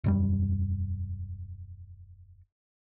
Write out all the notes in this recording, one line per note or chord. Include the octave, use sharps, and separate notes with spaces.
E1 F#2 G3